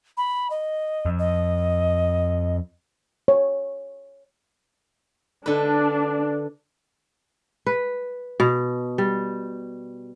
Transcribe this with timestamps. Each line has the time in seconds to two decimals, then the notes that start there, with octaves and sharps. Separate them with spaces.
0.17 B5
0.50 D#5
1.06 F2
1.19 D#5
3.28 C#5
5.46 D3 D4 B4
7.66 B4
8.40 B2
8.98 G3